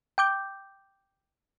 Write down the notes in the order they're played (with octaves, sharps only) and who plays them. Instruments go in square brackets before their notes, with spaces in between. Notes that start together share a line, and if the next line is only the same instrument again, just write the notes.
[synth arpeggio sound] G5 D6 G6